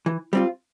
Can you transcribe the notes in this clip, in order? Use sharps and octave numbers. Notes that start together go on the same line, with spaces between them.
E3
G3 C4 F4